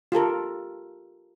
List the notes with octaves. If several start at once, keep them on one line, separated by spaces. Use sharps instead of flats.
F4 G4 A4 A#4